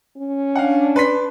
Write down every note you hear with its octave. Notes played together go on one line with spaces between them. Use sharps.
C#4
D4 F5 F#5
B4 C6 B6